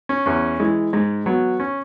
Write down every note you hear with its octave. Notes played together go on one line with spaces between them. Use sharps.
C#4
E2 C#4
E3 G#3
G#2 G#3
F#3 B3
C#4